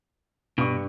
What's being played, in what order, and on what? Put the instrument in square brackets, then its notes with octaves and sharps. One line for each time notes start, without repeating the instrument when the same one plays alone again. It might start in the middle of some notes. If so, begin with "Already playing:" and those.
[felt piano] G2 C#6 [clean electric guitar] B2